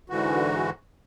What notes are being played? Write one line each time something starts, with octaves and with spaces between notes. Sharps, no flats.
G#2 D3 E3 F#4